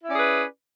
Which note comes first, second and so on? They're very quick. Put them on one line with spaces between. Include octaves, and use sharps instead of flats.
E4 C#4 D5 G#4 B4